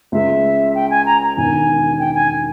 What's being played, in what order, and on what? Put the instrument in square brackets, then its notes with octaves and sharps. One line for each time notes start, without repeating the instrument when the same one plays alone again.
[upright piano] C#2 C#3 G#3 [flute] E5
[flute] G5
G#5
A#5
A#5
[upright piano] E1 E2 D#3 [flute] G#5
[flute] G5
G#5